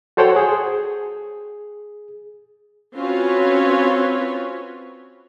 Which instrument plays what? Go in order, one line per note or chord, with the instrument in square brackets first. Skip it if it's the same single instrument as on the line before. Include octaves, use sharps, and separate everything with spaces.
[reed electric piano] F#4 A4 C5 C#5 F#5 G5
G#4
[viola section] C4 C#4 F4 F#4 B4 C#5